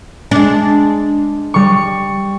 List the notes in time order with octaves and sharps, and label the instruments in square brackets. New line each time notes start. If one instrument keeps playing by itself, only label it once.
[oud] G#3 D4
[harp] G3 C#6